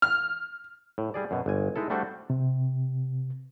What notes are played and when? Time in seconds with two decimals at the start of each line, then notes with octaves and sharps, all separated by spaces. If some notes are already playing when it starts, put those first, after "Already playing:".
0.02 F6
0.98 A2
1.14 G3 G#4 D5
1.31 F#2 B2
1.46 G1 G#5
1.76 G#3 D#4 E4 A4
1.90 G3 A3 D4 F#4 C5
2.30 C3